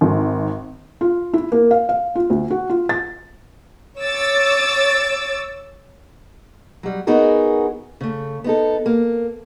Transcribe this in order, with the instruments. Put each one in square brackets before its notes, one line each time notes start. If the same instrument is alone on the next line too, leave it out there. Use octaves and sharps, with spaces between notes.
[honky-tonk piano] G#1
[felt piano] F4
E4
A#3
F5
F5
F4
D2
F#4
F4
A6
[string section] C#5 D6 E6 A6
[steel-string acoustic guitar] F#3 G3
B3 D#4 F#4 G#4 A#4
C#3 A3
B3 D#4 A4
A#3